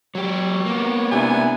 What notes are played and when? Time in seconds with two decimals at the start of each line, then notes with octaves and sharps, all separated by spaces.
0.15 F#3 G4 C#5
0.66 A#3 B3
1.11 C3 D4 E4 G#5